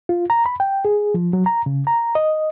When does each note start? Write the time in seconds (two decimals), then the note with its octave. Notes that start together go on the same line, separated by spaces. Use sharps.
0.09 F4
0.30 A#5
0.46 B5
0.60 G5
0.85 G#4
1.14 F3
1.33 F#3
1.46 A#5
1.66 C#3
1.87 A#5
2.15 D#5